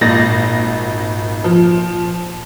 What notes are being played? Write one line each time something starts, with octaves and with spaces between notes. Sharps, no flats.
G#1 A#2 A6 A#6
F3